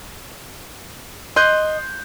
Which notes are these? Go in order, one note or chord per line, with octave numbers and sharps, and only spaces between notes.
D#5 C6 F#6 G6